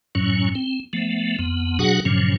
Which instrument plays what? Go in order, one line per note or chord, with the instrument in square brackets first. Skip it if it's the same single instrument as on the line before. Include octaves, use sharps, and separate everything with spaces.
[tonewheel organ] F#2 A2 F#3 C#4
C4
F3 A3 B3
F2 B3
B2 F#3 D4 F#4 G#4 F#5
G2 A#2 C#3 F3 F#3 C#4